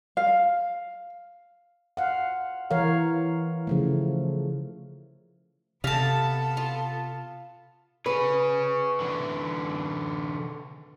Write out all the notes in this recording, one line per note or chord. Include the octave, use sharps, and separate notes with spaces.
F5
F5 F#5
E3 A#4 C#5 F5
C#3 F3 A3
C3 B3 A4 F5 A5
F4
C#4 G#4 B4
D3 E3